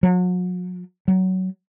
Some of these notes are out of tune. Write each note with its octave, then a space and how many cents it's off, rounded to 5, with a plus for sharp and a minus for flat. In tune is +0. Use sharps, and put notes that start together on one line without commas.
F#3 -40
F#3 +15